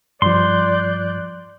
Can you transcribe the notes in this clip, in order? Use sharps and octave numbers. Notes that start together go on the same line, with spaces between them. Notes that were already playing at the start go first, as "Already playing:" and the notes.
G2 F3 D5 C6 F#6 G6